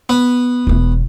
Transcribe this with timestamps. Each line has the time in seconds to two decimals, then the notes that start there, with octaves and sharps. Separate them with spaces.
0.09 B3
0.67 E1 E2